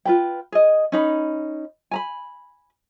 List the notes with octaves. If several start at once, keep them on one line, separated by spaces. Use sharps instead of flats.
F4 B4 G5
G#4 D#5
C#4 D#4 B5
G#5 A#5 B5